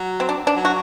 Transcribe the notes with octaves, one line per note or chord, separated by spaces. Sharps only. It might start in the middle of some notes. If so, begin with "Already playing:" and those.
Already playing: F#3
C4
D4
D4
F#3
F#4